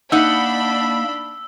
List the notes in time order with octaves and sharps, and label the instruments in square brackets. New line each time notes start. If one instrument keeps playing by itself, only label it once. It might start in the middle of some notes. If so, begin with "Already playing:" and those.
[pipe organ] A#3 [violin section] D4 B5 [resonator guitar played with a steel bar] D#4 F#5 [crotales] E6